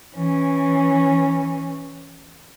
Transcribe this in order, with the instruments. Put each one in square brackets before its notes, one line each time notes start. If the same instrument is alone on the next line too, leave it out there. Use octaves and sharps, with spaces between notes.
[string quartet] E3 C#4